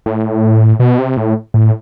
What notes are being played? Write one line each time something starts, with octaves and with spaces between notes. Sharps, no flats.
A2
B2
C3
A2
A2